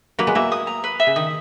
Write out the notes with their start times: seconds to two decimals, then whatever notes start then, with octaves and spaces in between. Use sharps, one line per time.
0.19 F#3 A#3 B4
0.27 G#3 B3
0.35 F#3 A#3 E5
0.52 D#6
0.67 A#5
0.84 B4
1.00 E5
1.07 C#3
1.16 D#3 D#6